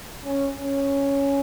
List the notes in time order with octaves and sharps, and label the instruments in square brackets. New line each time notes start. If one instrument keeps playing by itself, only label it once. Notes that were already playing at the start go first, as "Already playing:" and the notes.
[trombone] C#4
C#4